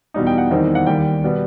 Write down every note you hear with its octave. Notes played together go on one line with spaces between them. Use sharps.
E2 B2 G3 D#4
G5
F#5
E2 D#3 G3 C4 D#4
F#5
D#2 D#3 G3 G5
B2 G3 B3